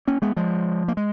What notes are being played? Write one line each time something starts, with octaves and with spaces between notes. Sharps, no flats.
A#3 C#4
G#3 B3
F3 G#3
A#3
G#3